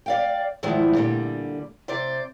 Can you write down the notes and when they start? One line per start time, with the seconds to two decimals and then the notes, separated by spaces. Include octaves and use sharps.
0.06 D5 F5 G5
0.63 E2 G#2 D#3 F3 A3 E4
0.95 A#2 D3 G3
1.88 C3 C5 D5